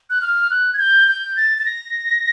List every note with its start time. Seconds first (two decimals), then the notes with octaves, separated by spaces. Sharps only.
0.10 F#6
0.21 F6
0.50 F#6
0.73 G#6
0.79 G6
1.08 G6
1.36 A6
1.58 A6
1.66 A#6